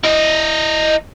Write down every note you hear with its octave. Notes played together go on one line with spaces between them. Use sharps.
E4 D#5